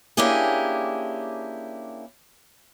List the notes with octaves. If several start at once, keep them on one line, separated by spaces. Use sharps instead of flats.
A#3 C#4 D4 E4 G4 G#4